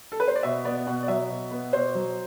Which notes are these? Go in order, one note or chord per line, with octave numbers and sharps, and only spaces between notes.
A4
B4
C5
D5
B2 E5
B3 D5
B2 F#5
D5
F#3 E5
B2
B3
B2 C5
F#3